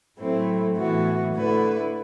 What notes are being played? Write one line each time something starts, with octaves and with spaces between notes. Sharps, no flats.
A2 F#3 A3 C4 E4
A2 E3 B3 F#4
D3 A3 E4 B4